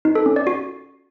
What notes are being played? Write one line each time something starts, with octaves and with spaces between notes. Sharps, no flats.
D#4
A4
C#4
D5
F#4